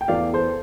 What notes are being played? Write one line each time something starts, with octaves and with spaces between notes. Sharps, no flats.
G5
E2 E3 A3 D5 F5
A4 C5